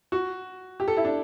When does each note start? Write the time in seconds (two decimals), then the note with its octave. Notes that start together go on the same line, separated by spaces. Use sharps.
0.12 F#4
0.80 G4
0.88 A4
0.97 E4
1.05 D4